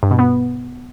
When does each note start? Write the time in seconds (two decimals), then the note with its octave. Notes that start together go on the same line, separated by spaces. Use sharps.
0.03 G2
0.11 B2
0.19 B3